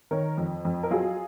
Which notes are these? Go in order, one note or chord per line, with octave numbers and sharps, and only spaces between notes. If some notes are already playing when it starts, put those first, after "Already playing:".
D#3 A#4 C#5
F2
F2
A#4
F#3 F4 G#4